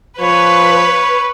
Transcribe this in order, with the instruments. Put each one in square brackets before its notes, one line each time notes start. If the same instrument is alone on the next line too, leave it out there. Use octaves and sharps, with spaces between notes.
[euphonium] F3 [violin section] B4 [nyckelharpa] C#5